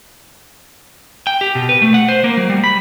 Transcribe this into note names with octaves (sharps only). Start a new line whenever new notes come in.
G5
G4
B2
B4
A3
F#5
C5
A#3
F#3
G3
B5